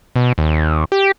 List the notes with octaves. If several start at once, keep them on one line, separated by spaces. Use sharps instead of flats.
B2
D#2
G4